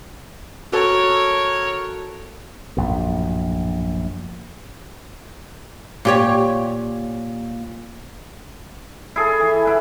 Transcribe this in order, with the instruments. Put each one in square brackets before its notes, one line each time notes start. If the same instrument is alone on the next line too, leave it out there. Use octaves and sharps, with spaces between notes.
[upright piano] F#4 A4 [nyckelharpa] A#4 C#5
[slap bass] A#1 F#2 A2
[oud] A#2 G4 C#5
[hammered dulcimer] E4 G#4 A4
E3
E4 F#5